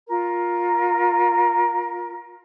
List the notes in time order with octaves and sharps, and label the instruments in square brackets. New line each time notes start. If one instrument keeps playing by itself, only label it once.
[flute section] F4 A#4